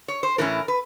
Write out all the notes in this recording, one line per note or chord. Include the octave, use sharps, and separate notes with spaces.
C#5
C5
A2 E3 A3 C#4 A#4
B4